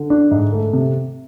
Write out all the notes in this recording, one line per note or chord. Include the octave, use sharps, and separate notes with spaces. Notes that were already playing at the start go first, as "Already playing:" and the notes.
Already playing: D3
D4
G#2
A3
C3